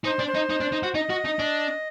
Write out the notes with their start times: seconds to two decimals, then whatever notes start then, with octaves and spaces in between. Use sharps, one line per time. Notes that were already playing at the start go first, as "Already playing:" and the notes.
0.04 D#4 C5
0.20 D4
0.27 C5
0.35 D#4
0.50 D#4
0.61 D4
0.72 D#4
0.83 F#4
0.94 D#4 D#5
1.10 F#4
1.25 D#4
1.39 D4